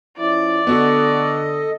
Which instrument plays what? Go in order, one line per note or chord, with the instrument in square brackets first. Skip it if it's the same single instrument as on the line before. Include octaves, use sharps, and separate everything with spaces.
[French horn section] F3 C#4 E4 [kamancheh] D5
[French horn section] D3 [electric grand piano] B3 F#4 [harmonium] A4 D#5